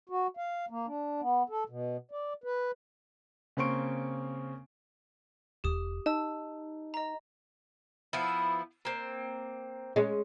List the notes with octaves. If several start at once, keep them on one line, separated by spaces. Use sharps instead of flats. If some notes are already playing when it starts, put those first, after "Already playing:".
F#4
F5
A#3
D4
B3
A4
B2
D5
B4
C#3 A#3 C4 C6 C#6 D7
E1 G4 D#6
D#4 A5 E6
D#5 A#5
F3 B3 E4
A#3 C4
G#3 C#4